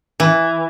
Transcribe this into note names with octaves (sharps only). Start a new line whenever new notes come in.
E3